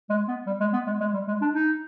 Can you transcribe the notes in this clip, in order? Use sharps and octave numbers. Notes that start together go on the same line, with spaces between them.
G#3
B3
G3
G#3
B3
G#3
G#3
G3
G#3
D4
D#4